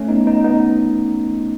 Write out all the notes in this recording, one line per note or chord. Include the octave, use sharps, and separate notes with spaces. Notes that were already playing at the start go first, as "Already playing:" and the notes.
Already playing: A3 C#4
B3 D#4
B3 D#4
B3 D#4